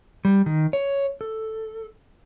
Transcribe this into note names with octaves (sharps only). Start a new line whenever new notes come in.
G3
D#3
C#5
A4